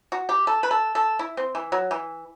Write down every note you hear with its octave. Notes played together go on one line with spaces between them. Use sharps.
F#4
G4
A4
B4
A4
A4
E4
C4
E3
F#3
E3